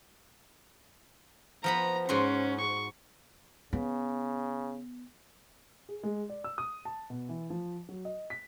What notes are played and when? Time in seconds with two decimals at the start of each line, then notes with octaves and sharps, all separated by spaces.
1.64 F3 B3 A#5 B5
2.09 G#2 C#4 F#4 C6
2.61 C#6
3.73 C#3 B3
5.89 G#4
6.03 G#3
6.29 D5
6.44 E6
6.58 D#6
6.85 A5
7.10 B2
7.29 E3
7.50 F3
7.89 F#3
8.05 D#5
8.30 B6